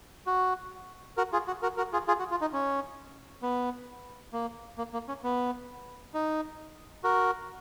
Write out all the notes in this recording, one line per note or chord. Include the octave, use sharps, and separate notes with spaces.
F#4
F#4 A#4
F4 G#4
F#4
F#4 A#4
F#4 A#4
F4 G#4
F4 G#4
F#4
F4
D#4
C#4
B3
A#3
A#3
A#3
C#4
B3
D#4
F#4 A#4